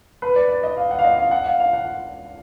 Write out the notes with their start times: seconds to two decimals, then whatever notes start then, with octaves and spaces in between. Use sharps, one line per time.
0.22 B4
0.36 D5
0.49 D5
0.64 D#5
0.77 F5
0.91 F#5
0.99 F5
1.04 D#5
1.18 F5
1.31 F#5
1.46 F5
1.60 F5
1.73 F#5